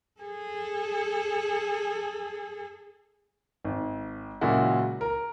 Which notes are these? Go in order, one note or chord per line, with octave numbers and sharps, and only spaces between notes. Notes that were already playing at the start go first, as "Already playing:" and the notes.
G#4 A4
G#1
A#2 C#3 F#3 G#3 E4 F#4
A#4